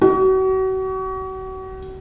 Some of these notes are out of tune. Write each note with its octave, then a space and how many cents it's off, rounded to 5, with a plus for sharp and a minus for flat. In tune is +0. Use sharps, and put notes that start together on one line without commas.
F#4 +35